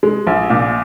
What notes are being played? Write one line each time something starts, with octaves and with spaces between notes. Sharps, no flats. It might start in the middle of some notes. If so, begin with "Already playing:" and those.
G#3
A#1
A#2